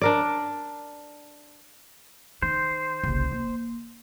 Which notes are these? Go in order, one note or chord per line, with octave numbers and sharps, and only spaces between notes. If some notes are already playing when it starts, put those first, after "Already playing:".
D4 A#4 D5
D#3 C5
F#1 C2
A#3